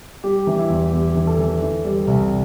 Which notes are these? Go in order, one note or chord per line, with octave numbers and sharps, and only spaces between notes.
G3 G4
E3
E4
E2
E2 G4
E3
A4
E3
E3
G3
C2